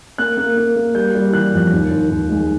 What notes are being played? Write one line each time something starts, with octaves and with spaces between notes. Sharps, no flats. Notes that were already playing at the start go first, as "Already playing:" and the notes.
A#3 F#6
A#3
A#3
A#3
G3 G6
G3
E3 F#6
F2
D#2
D#2
D#2
G#3